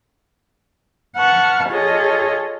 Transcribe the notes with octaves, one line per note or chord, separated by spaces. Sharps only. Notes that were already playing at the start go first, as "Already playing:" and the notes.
B4 F#5 A5 C#6 F6
F4 G#4 A4 C#5 D#5